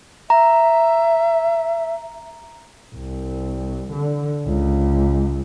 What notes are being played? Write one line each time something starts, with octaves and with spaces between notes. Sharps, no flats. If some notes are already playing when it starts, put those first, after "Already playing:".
E5 A#5
C2
D3
C#2